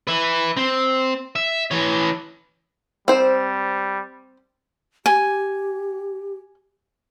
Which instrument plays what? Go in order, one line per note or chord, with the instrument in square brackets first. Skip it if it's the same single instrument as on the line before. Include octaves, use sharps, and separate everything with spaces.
[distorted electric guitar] B4 E5
C4
E5
E3 C#5
[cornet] G3 [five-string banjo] C4 C5
[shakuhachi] G4 [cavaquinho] G#5